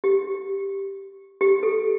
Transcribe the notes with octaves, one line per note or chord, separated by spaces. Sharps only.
G4
G4
A4